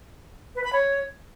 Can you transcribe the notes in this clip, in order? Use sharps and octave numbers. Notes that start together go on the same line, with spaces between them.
B4
B5
C#5